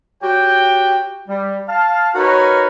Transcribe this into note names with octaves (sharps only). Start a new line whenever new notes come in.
F#4 G4 C#5 G5
G3
F5 A5
D#4 F#4 A#4 B4 C#5